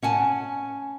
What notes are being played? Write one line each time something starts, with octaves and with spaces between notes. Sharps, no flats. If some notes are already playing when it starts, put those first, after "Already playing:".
C#4 F#5 G#5 A5